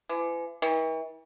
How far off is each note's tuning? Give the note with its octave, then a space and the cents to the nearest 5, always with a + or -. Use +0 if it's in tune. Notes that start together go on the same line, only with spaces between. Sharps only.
E3 +40
E3 -45